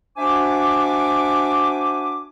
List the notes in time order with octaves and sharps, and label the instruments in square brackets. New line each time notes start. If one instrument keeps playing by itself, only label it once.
[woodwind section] D4 F#4 C5 E5 G#5 D6